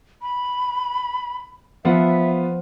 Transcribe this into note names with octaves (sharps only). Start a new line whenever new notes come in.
B5
F3 B3 F4 E5 F#5